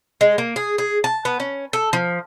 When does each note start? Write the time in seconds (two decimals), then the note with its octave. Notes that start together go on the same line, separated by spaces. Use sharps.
0.21 G#3
0.38 A#3
0.56 G#4
0.78 G#4
1.04 A5
1.25 B3
1.40 C#4
1.73 A4
1.93 F3